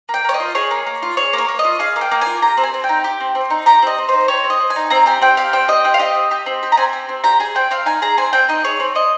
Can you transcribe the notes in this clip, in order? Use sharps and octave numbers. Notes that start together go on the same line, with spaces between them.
A#3 G5
A#3 C#5
D#5
F4
G#4 C#5
A#3
A#3
F4
G#4 C#5
A#3 C#5
A#3
D#5
F4
G#4 F5
A#3
G5
A#3
F4 G#5
G4 A#5
C4
G#5
C4
G5
D#4
G4
C4
C4
D#4
G4 A#5
C4 D#5
C4
D#4 C5
G4 C#5
C4
D#5
C4
G#5
D#4
C4 A#5
G4 G#5
C4 G5
G4 F5
C4 G5
G4 D#5
C4 G5
F5
G4 D#5
C4
G4
C4
G4
A#5
C4 G#5
G4
C4
G4 A#5
G#4 G#5
C4 G5
C4 F5
D#4 G#5
G#4 A#5
C4 G#5
C4 G5
D#4 D#5
G#4 C#5
C4
C4 D#5